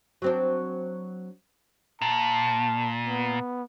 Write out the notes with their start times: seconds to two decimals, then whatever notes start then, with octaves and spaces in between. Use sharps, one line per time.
0.22 F#3 C4 D4
2.02 A#2 A5
3.07 B3